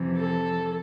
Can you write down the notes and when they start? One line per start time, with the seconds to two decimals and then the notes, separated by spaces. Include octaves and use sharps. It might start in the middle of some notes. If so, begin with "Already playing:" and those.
Already playing: F2 C3 E3
0.16 A4